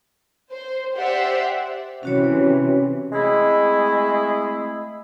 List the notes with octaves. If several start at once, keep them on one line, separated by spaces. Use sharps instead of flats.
C5
G4 C5 D5 E5 F#5
C3 E3 C#4 F#4 C#5
G#3 A3 C4 E4 G#4